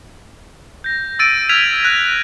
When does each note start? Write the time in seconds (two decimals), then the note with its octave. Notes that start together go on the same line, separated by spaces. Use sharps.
0.84 G6 A#6
1.19 E6 A6 D7 D#7
1.49 E6 F6 G#6 B6 D#7 F7
1.83 F#6 A#6